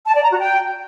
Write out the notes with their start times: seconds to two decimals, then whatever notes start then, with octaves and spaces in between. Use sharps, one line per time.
0.07 A5
0.15 D5
0.23 A#5
0.31 F#4
0.39 G5